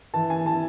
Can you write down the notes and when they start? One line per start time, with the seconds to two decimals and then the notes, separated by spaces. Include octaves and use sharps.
0.14 E3 A5
0.30 G#5
0.46 E3 A5